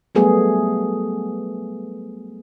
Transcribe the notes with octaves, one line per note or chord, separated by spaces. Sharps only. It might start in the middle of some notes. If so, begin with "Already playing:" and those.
F#3 G3 A3 B3 G#4